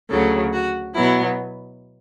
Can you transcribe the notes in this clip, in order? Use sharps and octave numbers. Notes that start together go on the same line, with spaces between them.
D2 C#3 F#3 A4
F#4
B2 F#3 B3 E4